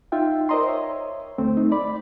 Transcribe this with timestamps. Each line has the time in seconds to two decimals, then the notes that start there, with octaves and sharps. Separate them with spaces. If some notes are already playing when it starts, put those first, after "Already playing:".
0.12 D#4 F4 E5 G5
0.49 A#4 C5 D5 D#5 A#5 C6
0.68 C#5 E5
1.38 D2 A3 C4
1.57 A3 D#4
1.72 D5 B5